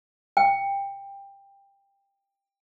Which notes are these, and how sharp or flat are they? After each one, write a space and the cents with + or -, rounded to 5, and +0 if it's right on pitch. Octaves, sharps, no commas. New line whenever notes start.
G5 +20